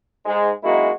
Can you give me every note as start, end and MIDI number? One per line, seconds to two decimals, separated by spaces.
0.24 0.49 44
0.24 0.49 56
0.63 0.89 42
0.63 0.89 56
0.63 0.89 58
0.63 0.89 63
0.63 0.89 64
0.63 0.89 66